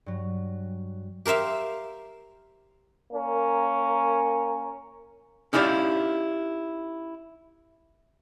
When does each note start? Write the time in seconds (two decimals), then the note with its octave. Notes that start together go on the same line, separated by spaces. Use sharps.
0.06 G2 F#3
1.26 G4 A#4 C5 E5 F5
3.12 A#3 C#4 A#4
5.53 C#4 D#4 E4 G4 D5 F5